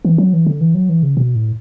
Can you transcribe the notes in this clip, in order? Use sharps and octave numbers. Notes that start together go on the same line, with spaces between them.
E3
F#3
E3
D3
E3
F#3
E3
C#3
B2
A2